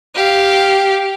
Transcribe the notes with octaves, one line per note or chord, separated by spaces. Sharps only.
G4 F5